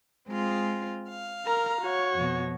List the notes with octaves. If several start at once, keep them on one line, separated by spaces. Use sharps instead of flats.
G#3 C4 F4
F5
A#4 A#5
F#4 C#5
F2 B2